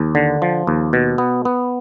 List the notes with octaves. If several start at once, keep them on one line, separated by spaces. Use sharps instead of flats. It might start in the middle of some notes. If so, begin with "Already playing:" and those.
Already playing: D#2
D3
F3
D#2
B2
B3
B3